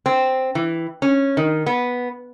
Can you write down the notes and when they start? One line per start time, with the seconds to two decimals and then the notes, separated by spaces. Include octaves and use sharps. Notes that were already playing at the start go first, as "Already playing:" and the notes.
0.06 C4
0.55 E3
1.02 C#4
1.37 D#3
1.66 B3